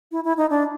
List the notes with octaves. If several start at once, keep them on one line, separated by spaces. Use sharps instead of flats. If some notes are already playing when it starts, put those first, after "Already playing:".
E4
E4
D#4
D4